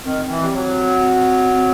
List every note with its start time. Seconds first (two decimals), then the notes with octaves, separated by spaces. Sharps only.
0.04 D#3 C4
0.29 E3
0.42 G3
0.54 F#3
1.52 C4